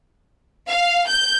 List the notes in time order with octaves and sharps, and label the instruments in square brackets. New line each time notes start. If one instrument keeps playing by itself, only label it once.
[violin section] F5
G6